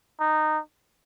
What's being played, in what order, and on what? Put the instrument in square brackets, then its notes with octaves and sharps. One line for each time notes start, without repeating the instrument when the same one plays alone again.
[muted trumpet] D#4